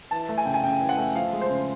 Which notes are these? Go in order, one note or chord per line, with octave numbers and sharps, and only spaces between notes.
E3 A5
A3
G#5
C#3 G5
G#5
C#3 G5
E3
F#5
A3
F3 F5
G#3
C5
C#3